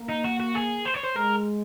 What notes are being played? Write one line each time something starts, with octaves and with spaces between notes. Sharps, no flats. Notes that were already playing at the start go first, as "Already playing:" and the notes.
Already playing: A#3
D#4
F#4
F#4
G#4
C5
C#5
C5
G#3 A#4